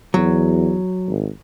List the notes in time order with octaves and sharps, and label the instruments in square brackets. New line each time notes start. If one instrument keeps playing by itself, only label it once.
[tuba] E2 [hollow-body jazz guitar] F#3
[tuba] G#1